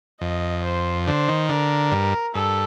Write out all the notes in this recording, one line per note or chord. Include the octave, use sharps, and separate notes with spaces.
F2 D#5
C5
D3 C5
D#3
D3 A#4
G2
G2 A4